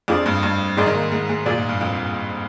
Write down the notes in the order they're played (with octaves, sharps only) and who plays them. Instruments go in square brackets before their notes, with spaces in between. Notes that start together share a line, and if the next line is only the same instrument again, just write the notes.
[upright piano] F2 [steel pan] D4 F4 G#4 D5
[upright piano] G2
G2
[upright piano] G#2 [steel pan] D#4 G#4 D5 G#5 C6
[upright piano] D#3
A#3
G#3
G#3
[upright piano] A#2 [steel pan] G#4 D5 G#5
[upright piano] G#2
G2
F2